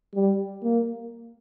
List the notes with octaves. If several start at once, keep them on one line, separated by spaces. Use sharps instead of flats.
G3
A#3